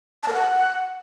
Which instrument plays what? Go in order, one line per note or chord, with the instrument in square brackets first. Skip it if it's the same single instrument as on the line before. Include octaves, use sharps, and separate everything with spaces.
[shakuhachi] A5
A#4
F#5